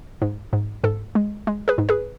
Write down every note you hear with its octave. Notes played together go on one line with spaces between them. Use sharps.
G#2
G#2
G#2 A4
G#3
G#3
G#4 B4
G#2
G#4 B4